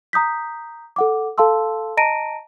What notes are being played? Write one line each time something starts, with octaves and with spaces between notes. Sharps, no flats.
A#5 D#6 G6 B6
A4 F#5 D6
A4 F5 A5 C6 E6
D#5 A5 A#5 A#6 D7 D#7